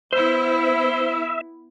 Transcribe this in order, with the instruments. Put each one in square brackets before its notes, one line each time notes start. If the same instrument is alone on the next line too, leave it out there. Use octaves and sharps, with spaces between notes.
[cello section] B3 E4 [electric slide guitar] C5 [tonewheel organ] E5